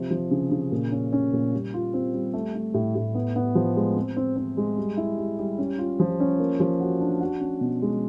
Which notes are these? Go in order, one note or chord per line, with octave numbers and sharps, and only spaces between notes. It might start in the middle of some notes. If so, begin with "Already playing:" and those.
Already playing: C3 F3
F3
C#3
C#3
A#2
C#4
C#4
A#2
G3
F4
C4
G3
A3
A3
A2
A2
B3
B3
F3
G#3
C4
C4
C4
G#3
G3
E4
G3
G3
C#4
F4
F3
C#4
A#3
F3
F#4
D4
F#4
C#4
B2
G#3